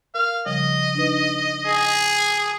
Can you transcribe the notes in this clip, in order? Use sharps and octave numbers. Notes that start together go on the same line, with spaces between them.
A#4 F5
C#3 F3 G3 D#5
D4 D#4 B4
G#4 D#6